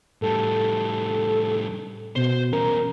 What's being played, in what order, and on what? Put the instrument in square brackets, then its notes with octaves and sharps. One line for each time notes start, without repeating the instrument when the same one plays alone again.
[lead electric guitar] A2 G3 [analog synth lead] A4
[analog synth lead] B2 [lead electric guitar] C5
[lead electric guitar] E2 C#4 [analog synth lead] A#4